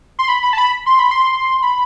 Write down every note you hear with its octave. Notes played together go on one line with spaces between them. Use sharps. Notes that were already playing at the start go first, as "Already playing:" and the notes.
C6
B5
B5
A5
B5
C6
B5
C6
B5